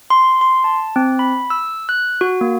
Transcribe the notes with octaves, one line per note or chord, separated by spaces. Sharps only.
C6
C6
A5
C4
B5
E6
F#6
F#4
A#3